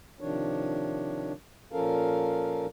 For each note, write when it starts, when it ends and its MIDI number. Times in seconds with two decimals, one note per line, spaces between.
0.20 1.32 48
0.20 1.32 51
0.20 1.32 53
0.20 1.32 62
0.20 1.32 73
1.72 2.66 46
1.72 2.66 53
1.72 2.66 61
1.72 2.66 69
1.72 2.66 70
1.72 2.66 77